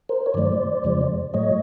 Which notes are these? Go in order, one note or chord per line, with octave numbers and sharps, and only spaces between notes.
A#4 C5
C#5
G2 D#3 F#3 A3 C5 D5
F2 C#3 F3 G#3
A2 F#3 A3 C#5 D#5